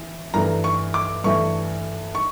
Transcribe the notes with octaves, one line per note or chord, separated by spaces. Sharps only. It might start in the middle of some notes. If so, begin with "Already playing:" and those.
Already playing: E3
G2 E3 A3 A#5
C#6
D6
G2 E3 A3 C#6
C#6